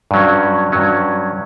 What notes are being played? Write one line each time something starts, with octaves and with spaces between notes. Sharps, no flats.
G2 F#3 C#4
G2 F#3 C#4